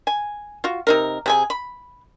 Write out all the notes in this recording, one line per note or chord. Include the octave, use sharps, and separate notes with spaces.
G#5
F4 F#4
C3 D#4 A#4
C3 G#4 G#5
B5